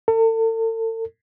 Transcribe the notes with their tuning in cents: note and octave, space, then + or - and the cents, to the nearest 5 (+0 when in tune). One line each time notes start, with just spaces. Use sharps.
A4 +40